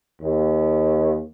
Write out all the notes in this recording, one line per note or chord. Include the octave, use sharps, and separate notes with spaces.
D#2